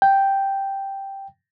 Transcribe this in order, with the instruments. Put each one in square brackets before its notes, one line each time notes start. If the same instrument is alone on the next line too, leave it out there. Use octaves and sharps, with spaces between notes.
[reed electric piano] G5